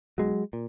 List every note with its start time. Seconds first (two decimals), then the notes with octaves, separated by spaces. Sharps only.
0.18 B1 F#3 G#3
0.53 A#2